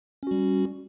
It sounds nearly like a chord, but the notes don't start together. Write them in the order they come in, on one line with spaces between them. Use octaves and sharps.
C#4 F#4 G3